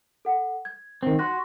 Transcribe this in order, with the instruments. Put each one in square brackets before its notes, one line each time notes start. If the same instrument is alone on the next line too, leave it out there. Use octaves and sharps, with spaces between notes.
[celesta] A4 F#5
G#6
[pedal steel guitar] D#3 C4
[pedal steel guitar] F#4 [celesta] C6 F#6 A#6